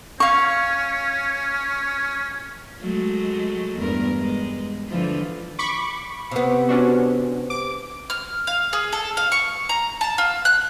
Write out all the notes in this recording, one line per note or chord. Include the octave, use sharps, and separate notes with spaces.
C#4 F5 C#6
F#3 G#3 A3
E2 G2 A#4
G#3
D3 E3 F3
B5 C#6 D6
C3 B3
C#4 D4 F#4
D6
F6
F5
G#4
A4
F5
C#6
A#5
A5
F4
F#6